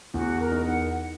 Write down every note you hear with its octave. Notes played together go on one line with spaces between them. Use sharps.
E2 F#4
A#4
D#4
F#5